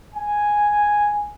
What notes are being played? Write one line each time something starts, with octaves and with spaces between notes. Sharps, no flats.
G#5